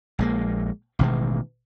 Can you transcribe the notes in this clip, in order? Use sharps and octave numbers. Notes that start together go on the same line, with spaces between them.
A#1 G#3 A#3
A1 B2 D#3 G#3